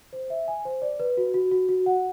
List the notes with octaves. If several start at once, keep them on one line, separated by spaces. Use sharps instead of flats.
C5
E5
G#5
C5
D5
B4
F#4
F#4
F#4
F#4
F#5